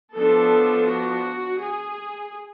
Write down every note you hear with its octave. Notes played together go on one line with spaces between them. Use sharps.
F3 B3 D4 A4
F#4
G#4